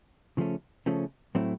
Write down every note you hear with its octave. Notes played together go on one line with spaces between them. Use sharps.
C#3 F3 A3 C#4
C#3 F3 A3 C#4
A2 F#3 A3 C4 E4